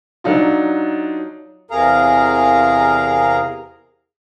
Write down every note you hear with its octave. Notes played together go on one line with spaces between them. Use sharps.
F#3 D4 D#4 F4
E2 C3 G#4 A#4 F5 A#5